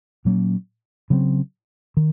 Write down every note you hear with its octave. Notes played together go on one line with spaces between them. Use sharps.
A#2 F#3 A#3 C#4
C#3 F#3 C4
D#3